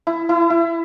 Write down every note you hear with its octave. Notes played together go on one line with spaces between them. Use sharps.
E4
E4
E4